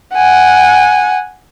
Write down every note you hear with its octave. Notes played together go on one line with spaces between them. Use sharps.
F#5 G#5